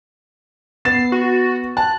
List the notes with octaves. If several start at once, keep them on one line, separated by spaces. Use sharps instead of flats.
B3 A6 C7 E7
F#4
A5 F#6